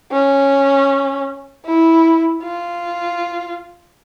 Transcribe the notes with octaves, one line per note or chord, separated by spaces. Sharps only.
C#4
E4
F4